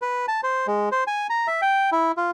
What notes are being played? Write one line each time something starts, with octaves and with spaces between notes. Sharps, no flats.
B4
A5
C5
G#3
C5
G#5
A#5
E5
G5
E4
F4